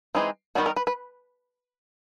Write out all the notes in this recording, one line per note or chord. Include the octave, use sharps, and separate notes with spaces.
E3 G#3 C4 D#4
D#3 G3 B3 D#4 F#4
A#4
B4
B4